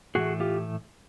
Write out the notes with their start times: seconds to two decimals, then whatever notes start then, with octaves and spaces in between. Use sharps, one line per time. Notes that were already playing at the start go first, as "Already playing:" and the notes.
0.15 A2 E3 A3 F#4 G#4
0.40 F4 G4